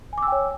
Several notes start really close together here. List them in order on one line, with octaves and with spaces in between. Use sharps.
G#5 D6 E6 G5 C#5